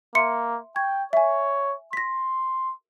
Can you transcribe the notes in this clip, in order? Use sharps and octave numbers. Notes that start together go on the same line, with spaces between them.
A#3 E5 C6 C#7
G5 C#6 G#6
C#5 E5 G#5
C6 A#6 B6